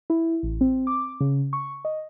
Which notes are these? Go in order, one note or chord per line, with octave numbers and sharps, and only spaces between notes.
E4
A1
C4
D6
C#3
C#6
D#5